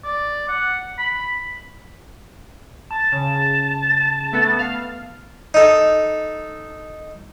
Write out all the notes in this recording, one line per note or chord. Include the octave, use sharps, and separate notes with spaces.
D5
F#5
B5
A5
C#3
A3 B3
F5
D#4 A4